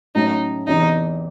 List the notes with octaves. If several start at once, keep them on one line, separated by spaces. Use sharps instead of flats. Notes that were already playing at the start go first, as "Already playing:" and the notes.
A2 F#3 A3 C#4 D#4
E2 C3 E3 D#4